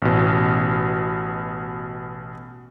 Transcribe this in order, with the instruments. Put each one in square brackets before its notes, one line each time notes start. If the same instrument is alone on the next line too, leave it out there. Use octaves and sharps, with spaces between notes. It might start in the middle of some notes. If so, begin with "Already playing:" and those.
[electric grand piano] A1 B2